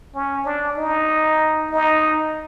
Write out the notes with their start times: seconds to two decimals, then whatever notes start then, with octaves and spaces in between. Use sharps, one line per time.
0.14 C#4
0.45 D4
0.76 D#4
1.71 D#4